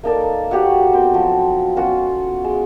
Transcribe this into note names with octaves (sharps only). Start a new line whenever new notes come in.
A#3 D#4 A4 D5
F#4 G4 C#5 F#5
B3 C4 G5
F3 F#3
B3 C#4 F4 F#4
G#3